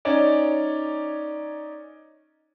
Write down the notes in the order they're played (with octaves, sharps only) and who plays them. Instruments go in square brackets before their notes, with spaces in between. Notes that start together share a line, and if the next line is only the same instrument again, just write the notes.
[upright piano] C#4 D#4 C#5 D5